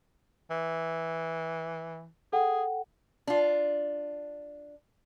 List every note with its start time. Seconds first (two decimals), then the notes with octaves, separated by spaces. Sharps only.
0.50 E3
2.33 G#4 A4 F#5 G5
3.27 D4 F4